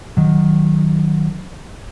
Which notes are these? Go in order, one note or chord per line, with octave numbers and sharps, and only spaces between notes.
D#3 F#3